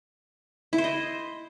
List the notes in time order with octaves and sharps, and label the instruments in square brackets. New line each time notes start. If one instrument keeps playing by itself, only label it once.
[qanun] E4
C5
D#5